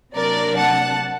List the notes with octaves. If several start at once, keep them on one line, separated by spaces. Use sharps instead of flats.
C3 F#3 A#3 D4 A#4 D5
F#5 A5